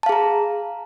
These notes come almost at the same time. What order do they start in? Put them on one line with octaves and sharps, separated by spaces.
A5 F5 G#4 A#5